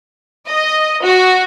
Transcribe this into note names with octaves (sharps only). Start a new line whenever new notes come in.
D#5
F#4